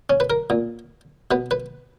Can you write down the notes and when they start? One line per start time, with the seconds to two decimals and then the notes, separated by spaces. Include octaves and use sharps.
0.10 C#4
0.20 B4
0.30 A#4
0.50 A#2
1.31 B2 B4
1.51 B4